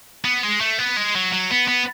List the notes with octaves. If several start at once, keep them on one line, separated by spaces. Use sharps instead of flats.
B3
G#3
A3
B3
G#3
F#3
F#3
B3
B3